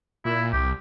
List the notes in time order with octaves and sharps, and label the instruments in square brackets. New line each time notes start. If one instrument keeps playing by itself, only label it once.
[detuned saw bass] A#2 [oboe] E4
[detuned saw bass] C2 [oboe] G4